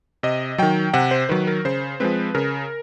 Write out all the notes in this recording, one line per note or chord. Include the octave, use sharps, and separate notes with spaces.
C3 D#5
D#3 F#3 G5
C3 F#5
C5
D#3 F#3 B4
A#4
C#3 C5
F3 G#3 C4 B4
C#3 A#4